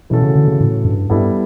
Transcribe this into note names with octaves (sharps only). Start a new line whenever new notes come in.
B2 E3 A3 C#4 F#4 A4
C#3
D3
C#3
A2
G2
G2 G3 B3 E4 A4